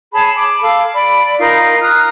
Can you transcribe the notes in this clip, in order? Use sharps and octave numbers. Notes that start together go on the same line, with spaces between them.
G#4 C#5 A5 B5
B5 D6
A4 F5
D5 B5
D#4 F4 A#4
A#5 D#6 F6 F#6